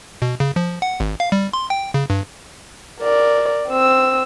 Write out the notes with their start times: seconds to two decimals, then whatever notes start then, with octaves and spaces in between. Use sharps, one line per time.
0.22 B2
0.40 C#3
0.56 F3
0.82 F#5
1.00 G#1
1.20 F5
1.32 G3
1.53 C6
1.70 G5
1.94 C#3
2.10 G2
3.01 A#4 D5
3.69 C4 E6